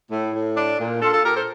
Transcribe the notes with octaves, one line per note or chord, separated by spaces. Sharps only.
A2
A2
D4
A#2
D4 F4 A4
F4 A4
A#2 G4 A#4
A4 C5